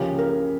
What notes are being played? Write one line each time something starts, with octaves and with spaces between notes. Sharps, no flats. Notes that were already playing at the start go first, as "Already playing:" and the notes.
Already playing: C#2 C#3 F3 A#3 C#4 G4
A#4